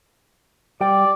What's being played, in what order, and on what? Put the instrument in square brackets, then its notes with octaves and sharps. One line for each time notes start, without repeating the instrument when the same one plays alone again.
[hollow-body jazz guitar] G3 G5 [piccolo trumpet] D5